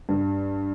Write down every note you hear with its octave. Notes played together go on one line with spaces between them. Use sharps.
G2